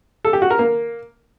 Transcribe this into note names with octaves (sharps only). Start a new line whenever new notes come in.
A4
G4
F#4
A#4
A#3